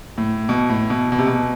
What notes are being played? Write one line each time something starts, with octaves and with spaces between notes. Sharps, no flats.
A2
B2
A2
B2
B2
C3
B2